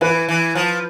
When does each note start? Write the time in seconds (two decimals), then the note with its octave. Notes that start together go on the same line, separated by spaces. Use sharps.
0.01 E3 B4
0.28 E3
0.55 F3